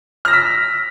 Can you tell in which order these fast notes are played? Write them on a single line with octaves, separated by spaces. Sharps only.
F6 A#6 E6 B6